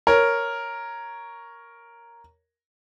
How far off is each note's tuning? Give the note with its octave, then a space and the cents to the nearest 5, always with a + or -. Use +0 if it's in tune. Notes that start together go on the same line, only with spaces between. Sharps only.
A#4 +0 C#5 +0